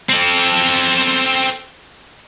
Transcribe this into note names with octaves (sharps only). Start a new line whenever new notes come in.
C4 A4